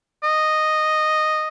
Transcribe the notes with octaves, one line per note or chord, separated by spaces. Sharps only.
D#5